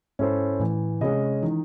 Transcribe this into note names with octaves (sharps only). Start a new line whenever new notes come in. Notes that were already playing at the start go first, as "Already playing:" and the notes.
G#2 C#4 E4 A4 C5
A2 E3
C3 G#3 C#4 G#4 D#5
D#3 E3